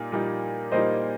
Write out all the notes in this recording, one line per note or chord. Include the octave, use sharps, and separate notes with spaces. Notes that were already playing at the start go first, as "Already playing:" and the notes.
Already playing: A#2 G3 A#3 D#4
A#2 G3 A#3 D#4
A#2 G3 A#3 D#4 C5 D#5